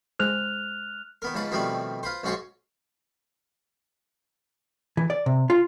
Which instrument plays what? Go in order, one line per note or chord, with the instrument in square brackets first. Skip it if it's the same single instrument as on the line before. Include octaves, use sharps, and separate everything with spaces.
[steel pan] G#3 C5 [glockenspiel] F6 F#6 F7
[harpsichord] D#3 B3 A#4
C#2 G#2 C#3 B4 A5
B2 D#3 F3 G3 A3 C4
F4 B4 C5
B1 G#2 C#4 F#4 C5 C#5
[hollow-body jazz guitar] E3
D5
C3
F4